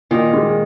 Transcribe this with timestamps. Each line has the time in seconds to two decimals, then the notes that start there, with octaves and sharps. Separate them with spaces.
0.11 A#2 D#3
0.33 G#3